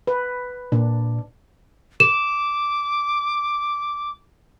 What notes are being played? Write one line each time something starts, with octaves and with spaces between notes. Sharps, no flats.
B4
A#2 D4
D6 E7